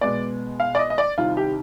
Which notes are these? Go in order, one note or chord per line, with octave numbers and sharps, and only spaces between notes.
B2 G#3 B3 D5
F5
D5
D#5
D#5
D5
C2 C3 D#3 F4
G4